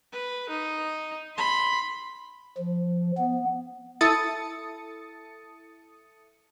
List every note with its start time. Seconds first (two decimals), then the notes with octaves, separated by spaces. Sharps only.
0.12 B4
0.49 D#4
1.36 B5 C6
2.58 F3
3.17 B3
4.01 E4 A4 D#6 A6 C#7